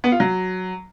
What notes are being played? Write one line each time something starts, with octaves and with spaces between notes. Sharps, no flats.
B3
F4
F#3